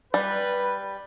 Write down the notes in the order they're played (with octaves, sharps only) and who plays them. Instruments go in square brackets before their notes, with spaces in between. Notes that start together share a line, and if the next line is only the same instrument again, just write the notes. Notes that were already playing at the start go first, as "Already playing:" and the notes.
[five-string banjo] G3 [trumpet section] B4